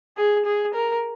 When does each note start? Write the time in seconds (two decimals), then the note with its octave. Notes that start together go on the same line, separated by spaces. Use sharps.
0.17 G#4
0.46 G#4
0.74 A#4